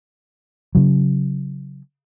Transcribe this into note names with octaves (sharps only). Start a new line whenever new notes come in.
C#3 F#3